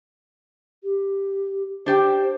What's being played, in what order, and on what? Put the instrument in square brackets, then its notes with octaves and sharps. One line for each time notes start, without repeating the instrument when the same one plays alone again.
[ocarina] G4
[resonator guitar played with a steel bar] D4 G4 G5 [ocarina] C5